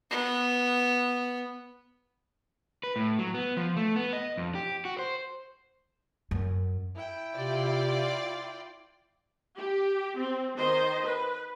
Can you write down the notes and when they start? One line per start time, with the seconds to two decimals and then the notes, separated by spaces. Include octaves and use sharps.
0.10 B3
2.83 B4
2.96 A2
3.19 F#3
3.34 B3
3.57 F3
3.77 A3
3.96 B3
4.13 D#5
4.37 F2
4.55 G4
4.85 F#4
4.99 C5
6.31 F#2
6.95 E4 G5
7.36 C3 F4 D5
9.57 G4
10.17 C4
10.57 D#3 C5 D#5
11.06 B4